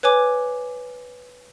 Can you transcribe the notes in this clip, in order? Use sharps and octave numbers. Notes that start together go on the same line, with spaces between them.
B4 C#5 G#5 D6